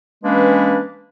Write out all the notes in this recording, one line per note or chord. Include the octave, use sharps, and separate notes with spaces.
E3 G#3 A#3 C#4 D4 B4